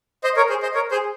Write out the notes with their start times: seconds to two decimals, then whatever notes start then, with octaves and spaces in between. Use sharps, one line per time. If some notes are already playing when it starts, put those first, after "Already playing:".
0.24 C5 D#5
0.37 A#4 C#5
0.49 G#4 C5
0.62 C5 D#5
0.74 A#4 C#5
0.91 G#4 C5